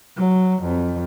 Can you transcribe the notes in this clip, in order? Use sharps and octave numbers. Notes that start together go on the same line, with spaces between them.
F#3
F2